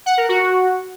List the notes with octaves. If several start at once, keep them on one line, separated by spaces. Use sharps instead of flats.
F#5
A#4
F#4